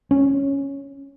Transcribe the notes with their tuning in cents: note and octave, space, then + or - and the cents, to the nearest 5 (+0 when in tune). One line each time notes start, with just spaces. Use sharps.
C#4 -5